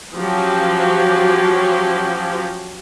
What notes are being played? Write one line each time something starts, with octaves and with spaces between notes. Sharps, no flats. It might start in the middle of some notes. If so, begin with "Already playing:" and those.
F3 F#3 C#4 G4